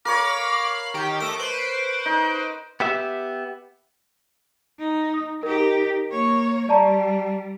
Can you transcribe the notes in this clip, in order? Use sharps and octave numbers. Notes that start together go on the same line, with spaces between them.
A#4 C#5 F5 B5 D6 F6
D#3 G4 G5
A3 D#5 D6 D7
B4 C5
D#4
B3 G4 E5
D#4
D#6
D#4 G4 A#4
A#3 C#5
G3 D5 A5 A#5